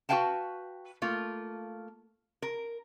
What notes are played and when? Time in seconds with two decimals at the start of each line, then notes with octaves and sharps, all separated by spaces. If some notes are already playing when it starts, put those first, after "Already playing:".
0.09 F#4 A4 B4 F5 G5 A5
1.02 A3 A#3 F4
2.42 A#4